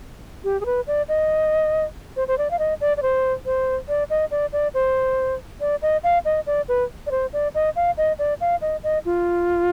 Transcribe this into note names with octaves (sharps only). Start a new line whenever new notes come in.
G4
G#4
B4
D5
D#5
C5
C5
D5
F5
D#5
D5
D5
C5
C5
D5
D#5
D5
D5
C5
D5
D#5
F5
D#5
D5
B4
D5
C5
D5
D#5
F5
D#5
D5
F5
D#5
D#5
F4